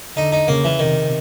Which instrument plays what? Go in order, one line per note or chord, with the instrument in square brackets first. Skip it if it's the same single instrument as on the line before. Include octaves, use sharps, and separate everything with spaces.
[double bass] D3 [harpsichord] D#4
[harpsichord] D#4
[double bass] C#3 [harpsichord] A#3
[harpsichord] E3
[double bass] C3 [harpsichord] D#3